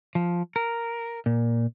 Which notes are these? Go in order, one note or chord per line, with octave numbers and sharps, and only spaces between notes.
F3
A#4
A#2